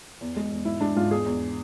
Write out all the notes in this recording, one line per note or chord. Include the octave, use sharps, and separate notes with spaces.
E2
G#3
E2
G#2 E4
G#3 D4
G#2 F4
E2 G#4
E2